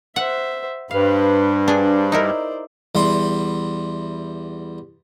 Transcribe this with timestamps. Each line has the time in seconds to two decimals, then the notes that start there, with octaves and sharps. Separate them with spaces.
0.16 C5 E5 F#5
0.91 G2 B4 C5 F5
1.68 D4 G#4 C5 D5
2.12 D#4 E4 A#4
2.95 E2 G3 C6